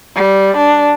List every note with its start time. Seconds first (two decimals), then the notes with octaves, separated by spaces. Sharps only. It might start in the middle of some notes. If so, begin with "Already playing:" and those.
0.16 G3
0.57 D4